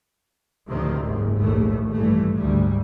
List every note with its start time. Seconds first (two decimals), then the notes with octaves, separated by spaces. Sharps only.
0.68 D2 A2 C3 D#3 F3 C4
1.02 F#1 G#2
1.38 A#1 D#2 A2 A3
1.93 G2 E3 A3
2.36 D2 G#2 G3